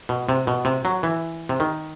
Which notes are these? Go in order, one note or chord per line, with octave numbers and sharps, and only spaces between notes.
B2
C3
B2
C3
F#3
E3
C3
D#3